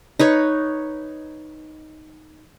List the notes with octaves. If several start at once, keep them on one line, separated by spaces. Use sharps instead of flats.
D#4 B4 C#5